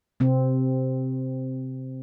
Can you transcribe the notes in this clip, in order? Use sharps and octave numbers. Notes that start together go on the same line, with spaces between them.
C3 C4